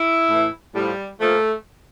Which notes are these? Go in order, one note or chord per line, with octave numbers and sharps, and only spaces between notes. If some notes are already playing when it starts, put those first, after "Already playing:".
Already playing: E4
A2 E3
A2 F3 G3
A#2 F3 A3